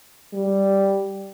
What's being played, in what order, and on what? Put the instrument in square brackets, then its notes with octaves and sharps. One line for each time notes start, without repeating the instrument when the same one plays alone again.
[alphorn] G3